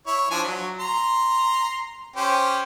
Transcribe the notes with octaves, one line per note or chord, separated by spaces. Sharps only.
E4 C#5
F3 D4 G#5
F#3
A#5 C6
C#4 G4 C5